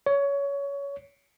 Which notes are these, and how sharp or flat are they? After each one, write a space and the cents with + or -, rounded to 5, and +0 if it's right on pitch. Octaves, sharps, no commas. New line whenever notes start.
C#5 +20